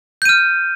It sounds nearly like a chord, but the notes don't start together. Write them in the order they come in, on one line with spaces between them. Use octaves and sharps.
G6 D#7 F6